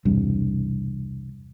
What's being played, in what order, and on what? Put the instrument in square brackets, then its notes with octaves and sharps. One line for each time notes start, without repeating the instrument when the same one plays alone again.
[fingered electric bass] E1 C2 G2